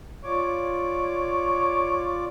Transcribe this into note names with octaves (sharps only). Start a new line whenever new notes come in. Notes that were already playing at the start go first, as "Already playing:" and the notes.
F4 C#5 D5 D6